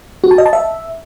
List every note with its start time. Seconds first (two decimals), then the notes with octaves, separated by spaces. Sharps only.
0.24 F#4
0.31 A5
0.38 D#5
0.46 A5
0.53 E5